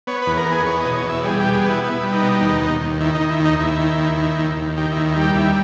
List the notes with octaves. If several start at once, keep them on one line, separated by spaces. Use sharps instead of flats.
B3 C#5
E2 B4
A#4
B3
G#4
E2 C#5
B2 D#5
C#5
E2 E5
G3 G#4
B2 G4
G#4
B3 E4
B3 E4
G3
D#4
B2
D#2
D#2
D#2
D#3 E4
D#4
D#3
E4
D#2
D#4
D#2 E4
D#3
D#2
D#3
D#2
D#2
D#3 G4
D#2 E4
E4
G3 G4
D#2 E4